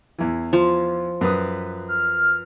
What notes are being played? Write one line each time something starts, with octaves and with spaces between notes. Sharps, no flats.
E2 E3
F3
F#2 B4 D#6
F6